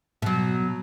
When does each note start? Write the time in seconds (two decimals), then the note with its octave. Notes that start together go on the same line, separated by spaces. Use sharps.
0.22 B2 F#3